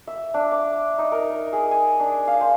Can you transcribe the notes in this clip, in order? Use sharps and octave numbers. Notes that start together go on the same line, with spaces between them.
E5
D4
D6
D#4
A#4
G#4
G#5
D4
F5
C5